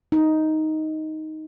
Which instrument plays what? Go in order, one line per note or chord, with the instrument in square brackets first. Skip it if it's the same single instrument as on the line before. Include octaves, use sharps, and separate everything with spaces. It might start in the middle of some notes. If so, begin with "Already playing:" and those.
[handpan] D#4